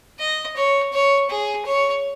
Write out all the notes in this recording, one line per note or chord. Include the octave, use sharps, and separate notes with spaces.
D#5
C#5
C#5
G#4
C#5